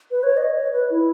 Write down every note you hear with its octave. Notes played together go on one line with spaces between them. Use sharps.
B4
C#5
D#5
C#5
B4
E4